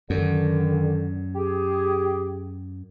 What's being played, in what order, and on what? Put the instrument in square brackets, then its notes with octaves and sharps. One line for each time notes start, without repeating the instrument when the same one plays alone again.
[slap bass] F#2 [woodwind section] D3 D#3
[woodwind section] G4 G#4